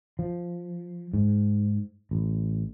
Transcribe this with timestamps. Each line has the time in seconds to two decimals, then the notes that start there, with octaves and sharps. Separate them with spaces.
0.19 F3
1.14 G#2
2.11 A1